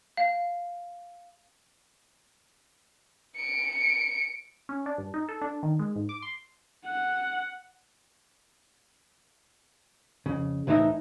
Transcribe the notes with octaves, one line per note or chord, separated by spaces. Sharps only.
F5
C#7 D7
C#4
D4
G2
D#4
A4
D4
D#3
G#3
G#2
D6
C6
F#5
F2 C#3
C2 A2 E3 G3 D#4 E5